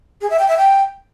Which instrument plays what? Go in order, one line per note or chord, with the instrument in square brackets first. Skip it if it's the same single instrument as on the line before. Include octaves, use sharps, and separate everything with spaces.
[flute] G#4
E5
G5
E5
G5